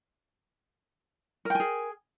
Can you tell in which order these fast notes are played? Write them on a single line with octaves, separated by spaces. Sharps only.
A#4 G5 G#5 G#4